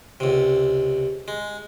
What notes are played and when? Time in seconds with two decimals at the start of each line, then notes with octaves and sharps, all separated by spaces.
0.20 C#2 C3
1.28 G#3